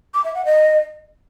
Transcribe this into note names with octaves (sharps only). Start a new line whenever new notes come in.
D6
E5
F#5
D#5